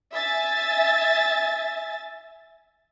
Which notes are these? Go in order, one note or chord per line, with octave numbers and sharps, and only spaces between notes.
E5 G#5 A6